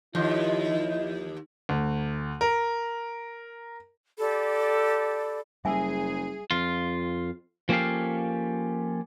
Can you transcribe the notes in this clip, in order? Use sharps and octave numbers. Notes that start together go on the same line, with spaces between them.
D#2 F3 E4 D#5
D2
A#4
G4 A4 D5 B5
F#1 G3 G#4 E5 G#5 E6
F2 F4
F3 A#3 C#4 G4 A4 F5